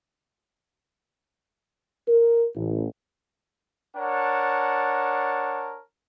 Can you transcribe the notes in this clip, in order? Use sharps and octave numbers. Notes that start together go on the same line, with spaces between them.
A#4
A1
D4 A#4 C#5 F#5 A5